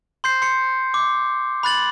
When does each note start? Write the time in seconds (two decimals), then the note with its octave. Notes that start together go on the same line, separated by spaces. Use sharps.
0.24 C6 G6 C7
0.42 C6 C#7
0.94 D6
1.63 B5 F#6 A6 F#7